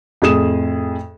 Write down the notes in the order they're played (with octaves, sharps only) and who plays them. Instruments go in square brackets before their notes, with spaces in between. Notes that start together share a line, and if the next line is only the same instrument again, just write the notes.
[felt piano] F2 A2 G#4 D#6 E7